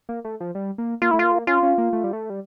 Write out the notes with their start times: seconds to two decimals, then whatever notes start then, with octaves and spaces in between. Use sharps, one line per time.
0.09 A#3
0.25 A3
0.40 F3
0.55 G3
0.78 A#3
1.02 A#3 F4
1.11 A3 E4
1.19 A#3 F4
1.32 A3
1.36 A#3
1.47 C#4 F4
1.63 C#4
1.78 A#3
1.93 A3
2.04 G3
2.13 A3
2.30 G3